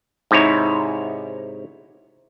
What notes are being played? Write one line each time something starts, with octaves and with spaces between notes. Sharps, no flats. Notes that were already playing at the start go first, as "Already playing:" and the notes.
G#2 C3 D#4 E4 C#5